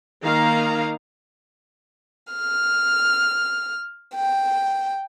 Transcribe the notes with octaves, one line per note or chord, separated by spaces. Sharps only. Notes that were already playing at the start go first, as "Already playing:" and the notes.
D#3 A#3 D#4 F5 A#5
F6
G5